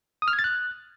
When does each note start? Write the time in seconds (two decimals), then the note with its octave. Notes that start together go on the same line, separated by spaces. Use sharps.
0.22 D#6
0.28 F6
0.33 G#6
0.39 A6
0.44 F#6